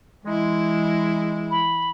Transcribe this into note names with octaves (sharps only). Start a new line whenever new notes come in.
E3 G#3 E4
B5